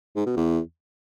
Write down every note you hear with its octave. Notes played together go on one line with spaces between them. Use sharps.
G#2
B2
E2